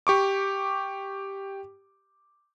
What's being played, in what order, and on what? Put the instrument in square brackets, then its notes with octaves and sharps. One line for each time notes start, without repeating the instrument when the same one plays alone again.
[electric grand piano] G4 C#6 D6